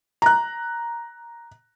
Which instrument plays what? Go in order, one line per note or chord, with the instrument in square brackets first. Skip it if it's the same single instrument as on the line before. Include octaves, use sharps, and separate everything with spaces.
[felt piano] A#5 F#6